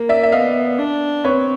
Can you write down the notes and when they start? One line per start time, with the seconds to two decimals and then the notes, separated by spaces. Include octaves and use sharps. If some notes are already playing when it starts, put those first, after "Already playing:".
Already playing: A#3
0.09 D5 E5
0.23 E5
0.32 B3 D#5 F5
0.78 D4
1.25 C4 B4 C#5